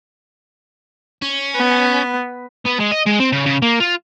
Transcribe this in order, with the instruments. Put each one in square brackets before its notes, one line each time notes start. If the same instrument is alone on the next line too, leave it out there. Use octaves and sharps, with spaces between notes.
[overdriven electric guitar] C#4
[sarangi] B3
[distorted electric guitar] B3
G#3
D#5
G#3
C4
C#3
C#3
A#3
F4